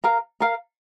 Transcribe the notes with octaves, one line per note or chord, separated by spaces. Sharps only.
A#4 F5 A#5
A#4 F5 A#5